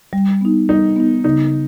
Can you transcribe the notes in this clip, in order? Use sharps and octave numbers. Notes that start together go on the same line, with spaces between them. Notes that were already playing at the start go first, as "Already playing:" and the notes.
G3
B3 D#4
G3 D#4
B3 D#4
C#3 D#4